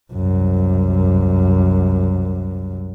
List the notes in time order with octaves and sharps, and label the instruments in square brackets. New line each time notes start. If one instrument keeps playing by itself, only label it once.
[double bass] C2 F#2